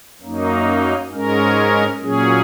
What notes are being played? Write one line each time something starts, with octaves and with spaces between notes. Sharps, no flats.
F#2 F#3 A#3 D#4
G#2 G#3 C#4 A#4
A#2 F#3 C#4 G#4